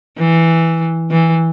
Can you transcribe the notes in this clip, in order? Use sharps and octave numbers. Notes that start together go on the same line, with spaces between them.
E3
E3